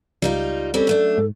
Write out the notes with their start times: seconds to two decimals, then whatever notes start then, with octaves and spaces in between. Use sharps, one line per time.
0.22 C#2 G3 D#4 F4
0.74 G3 C4 C#4 A4
0.87 F#2 A3 D4
1.18 G#2